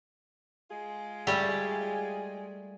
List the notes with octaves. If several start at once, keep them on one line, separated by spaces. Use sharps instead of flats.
G#3 F4 G#4
G3 A3 G4